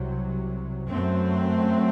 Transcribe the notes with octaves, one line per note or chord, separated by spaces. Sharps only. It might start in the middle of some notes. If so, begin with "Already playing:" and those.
Already playing: C2 C3 F#3
F#2 F#3 A3 C4